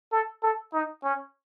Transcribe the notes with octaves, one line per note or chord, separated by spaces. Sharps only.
A4
A4
D#4
C#4